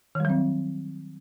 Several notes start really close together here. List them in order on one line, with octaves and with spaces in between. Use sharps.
D#3 G3 F#3 C4